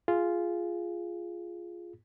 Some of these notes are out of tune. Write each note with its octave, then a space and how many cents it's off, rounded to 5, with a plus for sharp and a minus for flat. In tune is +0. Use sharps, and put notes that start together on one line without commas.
F4 -5 G#4 +0